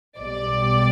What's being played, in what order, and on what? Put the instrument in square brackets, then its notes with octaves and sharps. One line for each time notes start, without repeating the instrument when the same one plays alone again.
[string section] B1 B2 G3 D5